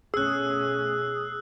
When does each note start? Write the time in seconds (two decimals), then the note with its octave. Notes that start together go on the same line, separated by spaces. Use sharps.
0.14 B2 A3 C#4 G#4 E6 F#6